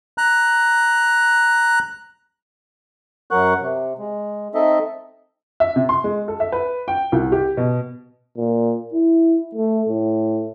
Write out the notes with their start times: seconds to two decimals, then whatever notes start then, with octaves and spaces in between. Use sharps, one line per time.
0.18 A#5 F#6
3.31 F#2 F#3 A#4 F#5 C#6 F#6
3.60 C3
3.98 G#3
4.54 C4 D#4 A4 D#5 E5
5.60 E5
5.76 C3
5.89 C6
6.04 G#3
6.28 A4
6.40 E5
6.52 B4
6.88 G5
7.12 C2
7.32 G4
7.57 B2
8.37 A#2
8.93 E4
9.55 A3
9.89 A2